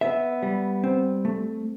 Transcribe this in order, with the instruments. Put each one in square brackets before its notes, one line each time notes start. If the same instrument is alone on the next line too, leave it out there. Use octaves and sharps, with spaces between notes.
[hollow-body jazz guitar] B3 E5
G3
C4
A3